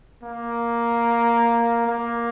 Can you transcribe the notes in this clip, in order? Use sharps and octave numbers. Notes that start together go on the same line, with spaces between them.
A#3
A#3